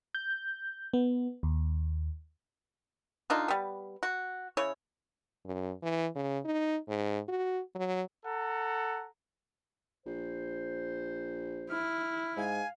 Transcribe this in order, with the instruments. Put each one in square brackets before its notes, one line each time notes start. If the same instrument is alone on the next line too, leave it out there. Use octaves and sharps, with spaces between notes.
[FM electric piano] G6
B3
D#2
[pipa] D3 D4 D#4 F4
G3 B3
F#4
C#3 E4 C#5
[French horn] F#2
E3
C#3
D#4
G#2
F#4
F#3
[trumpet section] A4 F#5 A#5
[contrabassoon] A#1 [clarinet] C5
[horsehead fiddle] E4 [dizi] F6
[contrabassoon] G#2 [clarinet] F5 [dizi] G#5